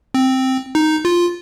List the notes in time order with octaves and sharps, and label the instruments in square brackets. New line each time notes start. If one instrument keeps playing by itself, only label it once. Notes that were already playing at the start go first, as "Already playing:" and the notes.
[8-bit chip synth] C4
D#4
F4